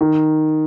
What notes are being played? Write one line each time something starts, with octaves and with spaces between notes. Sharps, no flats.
D#3